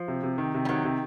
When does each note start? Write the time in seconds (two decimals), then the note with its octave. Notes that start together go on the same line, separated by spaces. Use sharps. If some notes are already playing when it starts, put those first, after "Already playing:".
Already playing: F3
0.08 C3
0.23 C3
0.38 D#3
0.54 C3
0.65 G3
0.69 D#3 F#3
0.85 C3